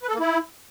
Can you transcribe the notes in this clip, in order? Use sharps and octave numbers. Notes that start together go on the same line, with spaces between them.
B4
A4
A#3
E4